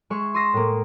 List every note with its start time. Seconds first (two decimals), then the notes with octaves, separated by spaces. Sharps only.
0.10 G#3 G#4 E5 C#6
0.34 C6 D#6 E6 A#6 C7
0.54 A2 A#3